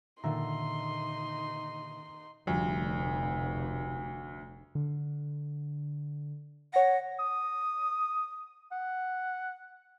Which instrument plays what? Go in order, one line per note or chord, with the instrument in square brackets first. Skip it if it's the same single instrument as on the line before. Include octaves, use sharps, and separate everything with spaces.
[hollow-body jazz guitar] A#2 D3 [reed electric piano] D#3 E5 A#5 [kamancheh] D#4 C6
[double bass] F1 [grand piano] D2 [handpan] F3 G3
[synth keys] D3
[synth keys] C#5 A#6 [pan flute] F#5
[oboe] D#6
F#5